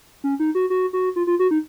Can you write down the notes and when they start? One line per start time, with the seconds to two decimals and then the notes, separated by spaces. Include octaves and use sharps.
0.24 C#4
0.40 D#4
0.55 F#4
0.70 F#4
0.93 F#4
1.16 F4
1.27 F4
1.39 F#4
1.51 D#4